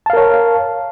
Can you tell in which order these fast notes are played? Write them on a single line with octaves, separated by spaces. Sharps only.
A5 F5 A#4 C#5